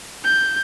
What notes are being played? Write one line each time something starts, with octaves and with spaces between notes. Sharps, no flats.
G6